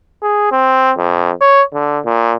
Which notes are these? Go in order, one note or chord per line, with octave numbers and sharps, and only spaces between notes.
G#4
C4
F2
C#5
D3
A#2